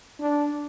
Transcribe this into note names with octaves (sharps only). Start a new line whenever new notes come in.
D4